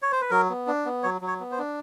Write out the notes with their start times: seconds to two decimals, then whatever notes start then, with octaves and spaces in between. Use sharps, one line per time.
0.02 C#5
0.12 C5
0.21 B4
0.31 F#3 A#4
0.50 B3
0.67 D4
0.85 B3
1.03 F#3 C#5
1.21 F#3
1.27 C#5
1.40 B3
1.52 C5
1.58 D4